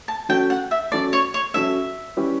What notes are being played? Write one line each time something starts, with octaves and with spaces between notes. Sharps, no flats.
A5
F#3 C#4 F#4 A4 G5
F#5
E5
F#3 C#4 F#4 A4 D5
C#5
C#5
F#3 C#4 F#4 A4 E5
G3 C#4 E4 G4 B4